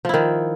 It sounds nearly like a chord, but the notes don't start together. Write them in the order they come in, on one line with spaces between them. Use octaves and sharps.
F3 E4 D#3